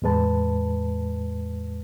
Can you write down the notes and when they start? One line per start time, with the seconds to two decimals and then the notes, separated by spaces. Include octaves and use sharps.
0.02 E2 A2 G#3 B4 A5